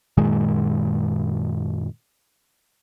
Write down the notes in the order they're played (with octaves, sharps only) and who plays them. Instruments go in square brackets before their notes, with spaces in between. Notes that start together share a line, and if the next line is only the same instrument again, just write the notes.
[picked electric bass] F#2 A#2 D#3 G#3